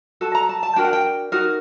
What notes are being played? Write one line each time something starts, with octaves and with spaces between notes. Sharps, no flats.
F#4 A4 A5
A#5
A5
A5
D4 F#4 A#4 G5
F#5
G5
D#4 F#4 A#4